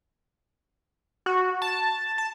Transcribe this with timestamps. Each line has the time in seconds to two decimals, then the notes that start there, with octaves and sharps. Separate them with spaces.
1.26 F#4
1.62 A5
2.18 A5